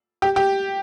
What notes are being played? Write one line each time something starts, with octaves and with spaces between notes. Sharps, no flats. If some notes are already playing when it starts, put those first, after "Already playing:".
G4
G4